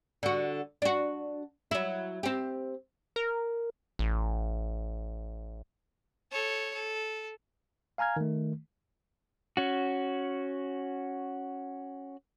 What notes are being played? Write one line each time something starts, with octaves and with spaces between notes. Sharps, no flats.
D3 F#4
D4 F#4
F#3 E4
C4 G4
A#4
A1
A4 C#5
A4
F5 G#5 A#5 F6 G#6
D#3 A3
C#4 F#4